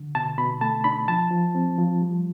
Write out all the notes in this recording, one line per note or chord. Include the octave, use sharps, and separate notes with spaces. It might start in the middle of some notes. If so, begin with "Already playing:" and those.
Already playing: D3
B2 A5
B2 B5
A3 A5
D4 B5
F3 A5
F3
C4
F3
G3